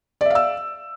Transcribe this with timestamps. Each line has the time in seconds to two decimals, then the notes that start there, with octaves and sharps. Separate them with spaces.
0.21 D5
0.26 E5
0.30 F5
0.35 E6